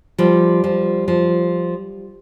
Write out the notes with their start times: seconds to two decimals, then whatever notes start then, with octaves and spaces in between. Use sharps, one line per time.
0.18 F3 G3
0.64 F3
1.08 F3